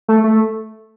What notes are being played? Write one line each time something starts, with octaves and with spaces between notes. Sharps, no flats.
A3
A3